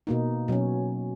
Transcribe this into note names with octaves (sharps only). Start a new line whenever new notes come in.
B2 A#3 D#4
B2 F#3 C#4